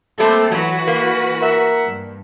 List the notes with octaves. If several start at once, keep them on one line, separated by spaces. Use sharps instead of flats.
G3 A3 A#3 C4 A4
E3 F#3 F#4 B4
A#3
A#4 E5 F#5
G2